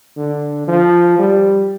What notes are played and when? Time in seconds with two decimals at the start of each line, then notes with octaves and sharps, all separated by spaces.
0.16 D3
0.68 F3
1.19 G3